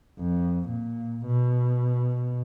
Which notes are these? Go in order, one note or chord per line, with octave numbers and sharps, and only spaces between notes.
F2
A#2
B2